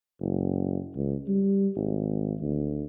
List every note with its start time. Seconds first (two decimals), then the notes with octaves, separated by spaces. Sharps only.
0.21 F#1
0.95 C#2
1.28 G3
1.76 G#1
2.41 D2